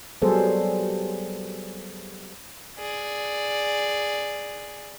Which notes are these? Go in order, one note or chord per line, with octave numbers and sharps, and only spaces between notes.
F#3 G3 B3 G#4 A4 C5
G#4 D5